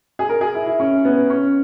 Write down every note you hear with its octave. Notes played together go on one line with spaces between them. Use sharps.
G#4
A#4
G#4
E4
E4
C#4
B3
C#4